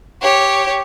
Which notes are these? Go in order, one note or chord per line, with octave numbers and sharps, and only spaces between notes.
G4 C#5